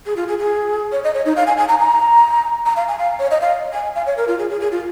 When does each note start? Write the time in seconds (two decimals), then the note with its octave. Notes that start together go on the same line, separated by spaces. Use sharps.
0.06 G#4
0.16 F4
0.28 G#4
0.38 G#4
0.92 C#5
1.04 D#5
1.14 C#5
1.25 D#4
1.36 F5
1.46 G#5
1.57 G#5
1.68 A#5
1.79 A#5
2.66 A#5
2.76 F5
2.88 G#5
2.98 F5
3.19 C#5
3.31 D#5
3.41 F5
3.73 G#5
3.95 F5
4.06 C#5
4.17 A#4
4.27 F4
4.38 G#4
4.50 G#4
4.60 G#4
4.71 F4